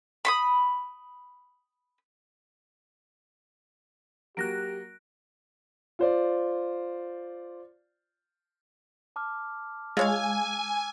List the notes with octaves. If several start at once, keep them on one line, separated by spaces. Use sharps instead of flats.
B5 C6 D#6
F#3 A#3 G4 F#6 A#6 D7
F4 C5 D5
A5 D6 F6
G#3 F4 C#5 F5 G#5 E6 G#6